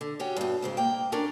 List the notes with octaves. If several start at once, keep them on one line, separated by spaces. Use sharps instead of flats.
D3
C#4 F#4 G4
G2 B2
G#2 C#3 C4
A#3 G5
C#4 D4 A#4